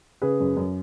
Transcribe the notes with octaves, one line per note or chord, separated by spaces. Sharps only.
C#3 G#4 B4
F#2
F#2